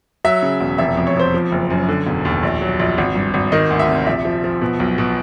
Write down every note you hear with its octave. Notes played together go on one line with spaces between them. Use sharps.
F#3 E5
C#3
E1
F1 E5
F2
C#5
F2 C5
F3
F#1
F#2
D3
E1
D#2
A#1
F#3
A#1
G#1
G2
G#1
D#3 D#5
D2
E5
C3
A#1 E5
F3
F3
B2
B1
B2